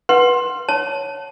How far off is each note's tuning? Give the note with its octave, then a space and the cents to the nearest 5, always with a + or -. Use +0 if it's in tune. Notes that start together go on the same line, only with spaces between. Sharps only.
B4 -20 F#5 +0 C6 +15
C#5 +0 A5 +0